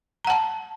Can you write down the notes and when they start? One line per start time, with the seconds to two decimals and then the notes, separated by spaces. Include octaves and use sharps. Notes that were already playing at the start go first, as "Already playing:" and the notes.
0.25 A#5
0.27 F#5
0.30 A5